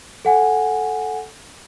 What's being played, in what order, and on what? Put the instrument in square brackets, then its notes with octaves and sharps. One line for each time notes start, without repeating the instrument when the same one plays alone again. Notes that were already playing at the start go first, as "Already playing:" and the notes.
[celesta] A4 F#5 G#5